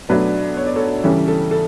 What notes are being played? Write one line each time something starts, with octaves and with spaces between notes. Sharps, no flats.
B2 F#3 A3 D4 B4 D5
C#5
D5
A4 C#5
C#3 E3 G3 C#4 A4
A4
A4